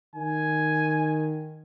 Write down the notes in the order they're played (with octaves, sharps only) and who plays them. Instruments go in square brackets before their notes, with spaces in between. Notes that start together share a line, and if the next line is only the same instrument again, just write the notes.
[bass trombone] D#3 [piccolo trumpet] G#5